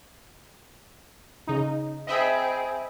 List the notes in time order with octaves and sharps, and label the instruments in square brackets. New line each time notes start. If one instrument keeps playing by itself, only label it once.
[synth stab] C#3 D#4
[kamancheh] C4 G#4 [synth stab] D#5 E5 B5